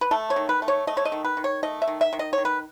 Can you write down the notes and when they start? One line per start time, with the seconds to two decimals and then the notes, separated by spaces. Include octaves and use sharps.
0.01 B4
0.11 A3 A4
0.30 C#5
0.36 D#3
0.49 B4
0.62 A3
0.68 C#5
0.87 A3 D#5
0.97 C#5
1.05 D#5
1.12 D#3
1.24 B4
1.37 D#3
1.44 C#5
1.63 A3 D#5
1.82 E5
1.88 D#3
2.01 E5
2.13 D#3
2.19 D#5
2.33 C#5
2.38 D#3
2.45 B4